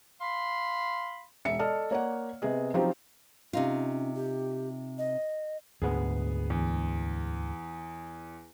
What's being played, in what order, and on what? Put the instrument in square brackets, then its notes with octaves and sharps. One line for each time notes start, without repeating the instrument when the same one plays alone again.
[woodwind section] F5 B5 C6
[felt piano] E1 E5 C#7
A4 D5 D#5 A5 F6
A#3 C#5 D5 F#5
C3 B3 G#4 D#5
F3 F#3 C4 D#4 F4 G4
[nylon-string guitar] C3 D#4 F4 [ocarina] C#4
[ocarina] G4
D#5
[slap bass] D2 G#2 [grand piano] B3 G#4
[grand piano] E2